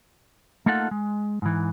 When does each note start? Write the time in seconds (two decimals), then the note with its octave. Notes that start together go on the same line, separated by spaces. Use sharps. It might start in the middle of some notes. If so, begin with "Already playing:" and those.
0.66 A3 A#3 D#4 F4 A4 F#5
0.91 G#3
1.42 G#2 E3